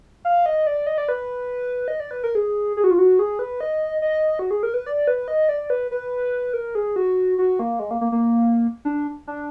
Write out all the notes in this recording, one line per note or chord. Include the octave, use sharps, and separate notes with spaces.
F5
D#5
D5
D#5
D5
B4
D#5
D5
B4
A#4
G#4
G#4
F#4
F4
F#4
G#4
B4
D#5
D#5
F#4
G#4
A#4
B4
D5
B4
D#5
D5
B4
B4
A#4
G#4
F#4
F#4
A#3
G#3
A#3
A#3
A#3
D4
D4